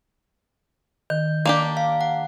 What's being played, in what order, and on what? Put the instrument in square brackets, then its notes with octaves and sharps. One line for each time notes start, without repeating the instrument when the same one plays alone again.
[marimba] D#3 [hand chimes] G6
[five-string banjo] A#3 D4 G4
[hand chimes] F5
F#5